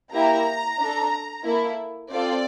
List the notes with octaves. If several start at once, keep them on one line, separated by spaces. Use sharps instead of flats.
A#3 E4 G4 A#5
D4 A4
A#3 E4 A4
C4 F4 A4 D5